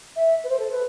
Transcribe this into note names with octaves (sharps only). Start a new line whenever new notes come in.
E5
B4
C5
A4
B4